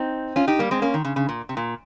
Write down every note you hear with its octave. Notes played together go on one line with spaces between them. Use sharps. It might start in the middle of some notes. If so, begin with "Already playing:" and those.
Already playing: C4 D#4
C#4 F4
D#4 G4
G3 A#3
G#3 C4
A#3 C#4
D#3
C#3
C#3
A#2
C3
A#2